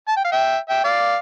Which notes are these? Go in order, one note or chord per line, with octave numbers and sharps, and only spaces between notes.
A5
G5
F5
E5 G5
E5 G5
D5 F5